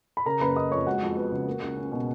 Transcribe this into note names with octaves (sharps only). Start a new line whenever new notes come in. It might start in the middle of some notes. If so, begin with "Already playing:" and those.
B5
C#3 A#4 A#5
F#1 B4 B5
F#1 D#5 D#6
F2 C#5 C#6
G#3 F#4 F#5
F2
B3
C#3
A#3
C#2
C#4
B2